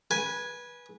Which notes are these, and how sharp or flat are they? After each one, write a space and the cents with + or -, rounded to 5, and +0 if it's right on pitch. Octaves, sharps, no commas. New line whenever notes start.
B4 -20 G#5 +0